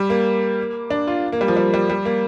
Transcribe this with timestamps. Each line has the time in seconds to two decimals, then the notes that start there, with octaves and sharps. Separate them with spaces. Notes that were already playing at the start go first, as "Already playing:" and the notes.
Already playing: G3
0.10 A#3
0.90 D4
1.08 F4
1.32 A#3
1.41 G3
1.48 F3
1.57 G3
1.74 G3
1.89 G3
2.05 A#3